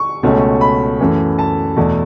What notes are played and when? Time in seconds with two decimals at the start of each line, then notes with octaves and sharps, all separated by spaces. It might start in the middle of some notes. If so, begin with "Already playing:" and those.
Already playing: C#6
0.23 C#2 B2 A3 C#4
0.61 B5
1.00 F#2 E3 A3
1.39 A5
1.76 E2 B2 A3